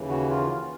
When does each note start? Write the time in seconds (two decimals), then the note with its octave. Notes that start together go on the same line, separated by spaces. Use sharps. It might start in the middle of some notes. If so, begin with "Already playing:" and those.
Already playing: D#2 C#3 E3
0.09 F#4
0.30 F4